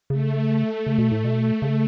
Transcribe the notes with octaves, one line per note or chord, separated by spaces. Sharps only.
C#3 A3
C#3 A3
B2
A2
B2
C#3